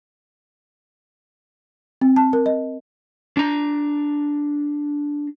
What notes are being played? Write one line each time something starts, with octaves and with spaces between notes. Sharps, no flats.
C4
A5
A#4
D#5
D4 A#5